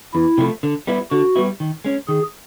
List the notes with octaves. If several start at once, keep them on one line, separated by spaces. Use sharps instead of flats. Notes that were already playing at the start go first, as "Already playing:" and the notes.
E2 E4
C3 F3 A3
D3
G3 B3 E4
D3 F#4
G3 B3 E4
D#3
G#3 C#4
D#3 G#4